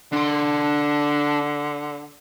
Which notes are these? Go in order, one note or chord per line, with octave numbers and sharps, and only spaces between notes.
D3 D4 C6